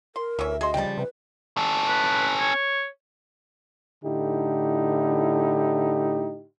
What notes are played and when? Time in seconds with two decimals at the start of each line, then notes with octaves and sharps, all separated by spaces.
0.16 A#4 C6
0.39 D2 E3 C#4 E5
0.61 F#4 G#4 D#5 C6
0.74 C#3 F3 G3 G5 A5
0.97 C3 B4
1.57 C#4 A4
1.88 B4
2.39 C#5
4.03 A2 D3 D#4 E4 G4